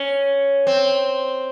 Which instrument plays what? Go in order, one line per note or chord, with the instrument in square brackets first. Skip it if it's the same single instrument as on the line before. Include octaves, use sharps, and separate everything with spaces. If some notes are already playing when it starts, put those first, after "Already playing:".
Already playing: [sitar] C#4
C4